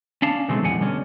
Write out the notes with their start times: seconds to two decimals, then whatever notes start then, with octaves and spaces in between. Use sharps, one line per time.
0.22 C#4 D4 F5 A5
0.48 B2 D#3 F#3 G#3 A3 C4
0.63 F2 A2 G3 F#5 G#5
0.80 B2 D3 G3 C#4